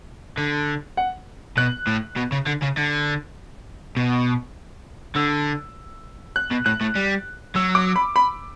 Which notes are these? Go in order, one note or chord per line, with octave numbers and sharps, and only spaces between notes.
D3
F#5
B2 F#6
A2
B2
C#3
D3
C#3
D3
B2
D3 E6
F#6
B2
A2 F#6
A2
G3
F#3 E6
D6
B5
B5